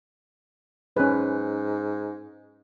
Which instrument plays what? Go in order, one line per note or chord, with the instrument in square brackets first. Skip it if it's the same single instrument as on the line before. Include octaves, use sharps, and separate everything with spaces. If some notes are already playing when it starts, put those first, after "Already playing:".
[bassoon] G#2 [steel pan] C#4 B4